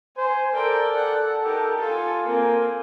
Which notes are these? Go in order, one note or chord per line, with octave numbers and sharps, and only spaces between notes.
C5 G#5
A4 A#4 D5 G5
F#5
D#4 G4 A#4
F4 A4 G#5
A#3 C4 A#4 G#5